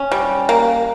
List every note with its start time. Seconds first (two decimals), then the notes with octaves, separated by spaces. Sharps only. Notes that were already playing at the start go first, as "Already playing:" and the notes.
Already playing: C#4
0.12 G3
0.49 A#3